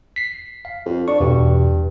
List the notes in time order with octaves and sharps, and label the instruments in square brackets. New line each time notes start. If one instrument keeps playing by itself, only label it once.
[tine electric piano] B6 C7
F5
[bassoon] F2
[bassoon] D4 [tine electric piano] C#6
[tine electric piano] E2 B2 [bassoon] G2